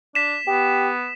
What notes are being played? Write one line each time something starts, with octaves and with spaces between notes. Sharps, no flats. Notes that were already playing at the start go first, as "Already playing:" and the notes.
D4 B6 E7
B3 G4